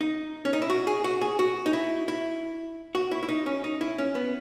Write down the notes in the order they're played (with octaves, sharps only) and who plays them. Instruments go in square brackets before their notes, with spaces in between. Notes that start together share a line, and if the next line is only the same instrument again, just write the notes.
[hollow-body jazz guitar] D#4
C#4
D#4
E4
F#4
G#4
F#4
G#4
F#4
D#4
E4
E4
F#4
E4
E4
D#4
C#4
D#4
E4
C#4
B3